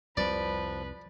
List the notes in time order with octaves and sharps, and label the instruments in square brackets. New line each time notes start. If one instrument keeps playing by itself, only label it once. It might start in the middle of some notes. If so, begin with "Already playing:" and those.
[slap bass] C2 F2 C3 [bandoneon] F3 [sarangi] B4 [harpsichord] D5